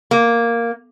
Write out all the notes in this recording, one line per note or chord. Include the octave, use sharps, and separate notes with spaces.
A#3